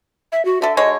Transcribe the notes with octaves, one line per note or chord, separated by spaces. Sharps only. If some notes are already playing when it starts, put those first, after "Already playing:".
E5
F#4
D3 A4 E5
D3 G#3 C#5 D#5